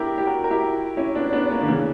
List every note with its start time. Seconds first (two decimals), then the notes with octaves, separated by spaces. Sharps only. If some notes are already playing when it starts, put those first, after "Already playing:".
Already playing: B3 D4 E4 G4 A#4
0.18 G4
0.26 F#4 A#4
0.44 A#4
0.51 E4 G4
0.97 C#4 E4
1.15 B3 D4
1.33 B3 D4
1.51 A#3 C#4
1.61 D3
1.68 C#3 E3